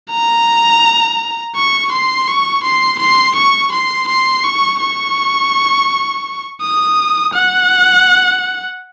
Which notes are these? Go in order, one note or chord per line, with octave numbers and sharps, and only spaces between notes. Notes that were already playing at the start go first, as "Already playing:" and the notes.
A#5
C#6
C6
C#6
C6
C6
C#6
C6
C6
C#6
C#6
D#6
F#5